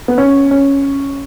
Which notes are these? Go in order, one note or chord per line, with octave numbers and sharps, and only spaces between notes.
B3
C#4
C#4